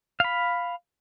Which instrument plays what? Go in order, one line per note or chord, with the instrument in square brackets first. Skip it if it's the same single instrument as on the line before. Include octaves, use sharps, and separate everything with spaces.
[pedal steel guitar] F5 B5